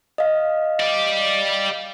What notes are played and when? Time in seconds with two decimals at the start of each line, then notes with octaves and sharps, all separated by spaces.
0.18 D#5 F5
0.80 G4 D5